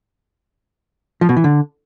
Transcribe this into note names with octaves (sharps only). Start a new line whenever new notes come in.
F3
B2
E3
D3